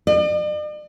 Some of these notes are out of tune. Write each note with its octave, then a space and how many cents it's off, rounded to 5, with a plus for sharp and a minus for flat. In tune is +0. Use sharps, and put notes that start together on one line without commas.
D5 +45